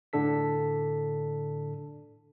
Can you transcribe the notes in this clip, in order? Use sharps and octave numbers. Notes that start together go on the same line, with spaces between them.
A2 D3 D4 A4 B6